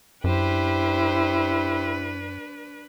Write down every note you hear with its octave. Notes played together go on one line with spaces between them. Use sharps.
F#2 D4 E4 G4 B4 C5